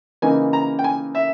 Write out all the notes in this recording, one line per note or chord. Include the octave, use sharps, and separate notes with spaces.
C#3 E3 A#3 D#4 G#5
A#5
G5
G#5
E5